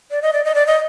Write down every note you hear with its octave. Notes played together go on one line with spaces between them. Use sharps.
D5
D#5
D5
D#5
D5
D#5